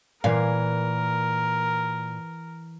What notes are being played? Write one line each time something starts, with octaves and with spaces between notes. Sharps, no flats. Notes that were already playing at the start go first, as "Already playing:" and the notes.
A#2 E3 A#4 B4 F5 G#5